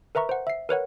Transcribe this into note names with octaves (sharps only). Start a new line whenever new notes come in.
A#4 B4 E5 A#5 C#6
C5 F#5
E5 C7
A#4 B4 C#5 F#5